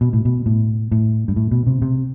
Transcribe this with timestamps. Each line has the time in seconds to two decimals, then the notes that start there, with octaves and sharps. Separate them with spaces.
0.01 B2
0.13 A2
0.25 B2
0.46 A2
0.92 A2
1.28 G2
1.36 A2
1.51 B2
1.67 C3
1.82 C3